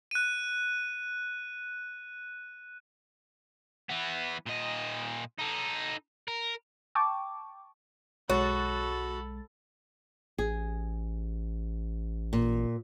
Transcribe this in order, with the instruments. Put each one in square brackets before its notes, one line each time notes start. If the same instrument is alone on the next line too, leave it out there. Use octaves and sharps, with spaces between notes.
[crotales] F#6 D#7
[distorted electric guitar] E3 B3
A#2 D#5
D#4 A4
A#4
[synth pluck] G5 A5 C#6 D6
[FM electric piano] B1 G#3 A6 [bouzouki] F#4 [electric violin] A4 B5 [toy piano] C#5
[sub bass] A1 [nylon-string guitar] G#4
[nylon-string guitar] A#2